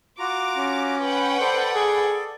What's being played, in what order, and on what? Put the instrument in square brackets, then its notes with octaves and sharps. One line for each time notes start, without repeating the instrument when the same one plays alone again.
[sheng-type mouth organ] F4 F#4 A#5 [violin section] D6
[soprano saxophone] C#4
[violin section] B4 F#5 G5
[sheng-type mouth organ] A4 D5 [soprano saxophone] C5
[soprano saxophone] G#4